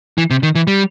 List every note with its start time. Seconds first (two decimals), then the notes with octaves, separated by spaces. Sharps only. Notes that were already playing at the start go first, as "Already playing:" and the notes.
0.18 E3
0.30 C3
0.43 D#3
0.55 E3
0.67 G3